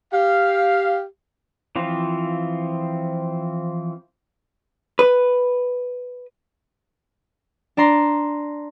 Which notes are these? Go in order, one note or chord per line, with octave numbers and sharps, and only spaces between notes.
G4 F5
E3 F3 C4 F4
B4
D4 D5 A#5 C6